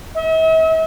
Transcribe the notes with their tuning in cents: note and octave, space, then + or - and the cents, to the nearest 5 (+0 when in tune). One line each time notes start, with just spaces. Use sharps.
E5 -45